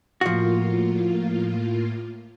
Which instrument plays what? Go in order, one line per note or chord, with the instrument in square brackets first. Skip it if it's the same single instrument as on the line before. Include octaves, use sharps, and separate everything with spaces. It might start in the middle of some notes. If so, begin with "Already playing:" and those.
[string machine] A2 A#3 F4 [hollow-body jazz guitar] F3 F#4